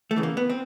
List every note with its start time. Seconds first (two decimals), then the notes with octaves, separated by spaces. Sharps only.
0.11 A3
0.16 E2 C#3 E3
0.23 A#3
0.37 B3
0.50 C4